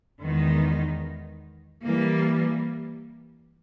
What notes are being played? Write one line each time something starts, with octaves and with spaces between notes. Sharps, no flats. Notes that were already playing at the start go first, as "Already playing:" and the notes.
E2 D#3 G#3 B3 D#4
E3 G3 A#3